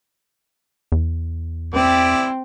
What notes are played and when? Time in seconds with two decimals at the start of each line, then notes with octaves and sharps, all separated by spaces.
0.92 E2
1.74 C4 E4 G4 D5